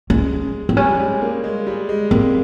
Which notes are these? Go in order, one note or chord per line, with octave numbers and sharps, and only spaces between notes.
G#3 C#4
C4
G3 C#4
G#3
A#3
G#3
G3
G#3
A#3 C4